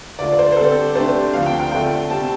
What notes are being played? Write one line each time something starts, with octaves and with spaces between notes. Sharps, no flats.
D3 A3 F4 D5
D5
C5
C5
D3 G3 C4 G4 A4
C3 A3 D4 G4 C5
D2 D3 F3 C4 F5
G5
G5
D3 A3 C4 F4 G5
C3 G3 C4 A5